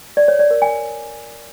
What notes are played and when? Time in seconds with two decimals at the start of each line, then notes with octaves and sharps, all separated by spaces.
0.17 D5
0.28 C#5
0.39 D5
0.51 A#4
0.62 G#5